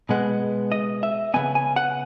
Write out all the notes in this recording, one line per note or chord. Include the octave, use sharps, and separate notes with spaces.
B2 G#3 B3
D#5
E5
C#3 E3 B3 G#5
G#5
F#5